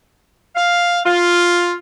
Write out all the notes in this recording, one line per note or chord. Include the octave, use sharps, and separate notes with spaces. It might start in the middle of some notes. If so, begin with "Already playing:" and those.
F5
F4